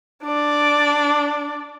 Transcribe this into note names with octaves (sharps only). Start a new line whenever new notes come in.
D4 D5